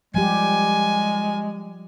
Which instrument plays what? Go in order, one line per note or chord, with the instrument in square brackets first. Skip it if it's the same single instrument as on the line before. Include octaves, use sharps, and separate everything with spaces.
[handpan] F3 G3 G4 [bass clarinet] G#3 [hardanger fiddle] G#5